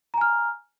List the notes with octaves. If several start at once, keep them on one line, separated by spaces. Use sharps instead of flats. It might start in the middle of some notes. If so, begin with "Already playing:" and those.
G#5 A#5 F6